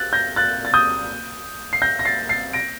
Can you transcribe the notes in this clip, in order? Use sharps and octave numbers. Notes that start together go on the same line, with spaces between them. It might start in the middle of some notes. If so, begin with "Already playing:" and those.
Already playing: F#6 A6
G6 A#6
F#6 A6
A6
D#6 G6
C7
G6 A#6
A#6
A6 C7
A6 C7
A#6 D7